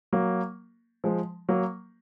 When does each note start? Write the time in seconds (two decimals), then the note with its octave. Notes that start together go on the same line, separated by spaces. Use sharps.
0.12 F#3 A#3
1.04 F3 G#3
1.49 F#3 A#3